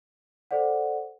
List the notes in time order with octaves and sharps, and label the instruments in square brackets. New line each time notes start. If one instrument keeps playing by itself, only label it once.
[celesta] A4 C5 D5 F#5